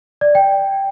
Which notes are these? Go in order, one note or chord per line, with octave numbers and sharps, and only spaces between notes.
D5
G5